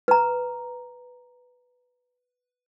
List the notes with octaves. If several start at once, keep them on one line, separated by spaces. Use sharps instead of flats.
B4 A#5